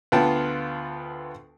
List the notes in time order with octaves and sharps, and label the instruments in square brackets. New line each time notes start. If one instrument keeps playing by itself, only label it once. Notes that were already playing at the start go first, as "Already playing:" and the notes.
[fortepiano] D2 B3 F4 G5 A5